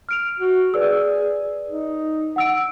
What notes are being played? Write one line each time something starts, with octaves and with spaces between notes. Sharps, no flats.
F6 D7 F7
F#4
G#4 B4 D5 E6
D#4
F#5 E6 D7